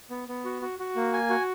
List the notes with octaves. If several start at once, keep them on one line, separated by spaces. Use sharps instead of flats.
B3
B3
F#4
F#4
F#4
A#3
G#5
F#4